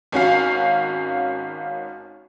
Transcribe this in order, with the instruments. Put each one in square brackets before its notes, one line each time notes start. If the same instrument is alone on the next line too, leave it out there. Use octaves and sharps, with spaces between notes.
[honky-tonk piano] G#1 C#4 F#4 F5